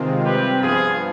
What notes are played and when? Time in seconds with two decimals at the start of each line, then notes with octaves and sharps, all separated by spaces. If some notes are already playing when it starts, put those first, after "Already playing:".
Already playing: C3 D#3 G#3 C4 F4
0.24 C3 G3 C4 G4 B4
0.61 G2 F3 B3 F4 G#4